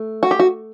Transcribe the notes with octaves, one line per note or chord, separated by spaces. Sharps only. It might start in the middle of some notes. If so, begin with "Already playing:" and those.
Already playing: A3
F#4
G4
F#4